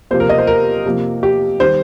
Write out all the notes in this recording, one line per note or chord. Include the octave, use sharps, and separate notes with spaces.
C3 F3 A#3 C5
A#4
D#5
C5
A#4
C3 F3 A#3
G4
D#3 G3 C5